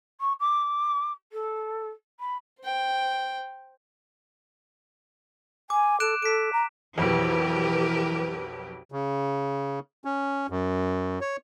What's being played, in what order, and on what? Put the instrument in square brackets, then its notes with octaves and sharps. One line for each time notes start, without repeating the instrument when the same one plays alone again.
[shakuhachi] C#6
D6
A4
B5
[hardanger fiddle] C5 G5
[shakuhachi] G#5 [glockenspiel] D6
[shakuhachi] A4 [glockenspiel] F#6 D7 E7
[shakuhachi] A4 [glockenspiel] B6 D7
[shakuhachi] A#5
[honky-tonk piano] B1 F2 [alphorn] E3 [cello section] G4 A#4 B4
[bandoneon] C#3
C#4
F#2
C#5